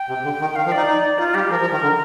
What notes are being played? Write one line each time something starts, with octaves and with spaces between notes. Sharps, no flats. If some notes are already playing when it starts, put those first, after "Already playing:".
Already playing: G5
C3
D3
D#3
D#3 F5
F3
D5
D#4
D#4
D#4 F4
G3 G4
F3 A#4
F3
D#3
D3